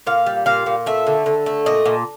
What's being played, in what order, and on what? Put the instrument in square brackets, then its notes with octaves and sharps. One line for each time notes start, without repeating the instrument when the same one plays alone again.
[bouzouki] A#2 F5
G3
A#2 F5
A#2
A3 E5
D3
D3
A3
A#2 D#5
A#2